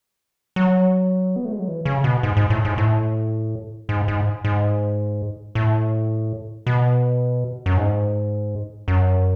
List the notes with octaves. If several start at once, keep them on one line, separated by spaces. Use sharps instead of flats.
F#3
B3
A3
G#3
F#3
E3
C#3
B2
G#2
G#2
A2
G#2
A2
G#2
G#2
G#2
A2
B2
F#2
G#2
F#2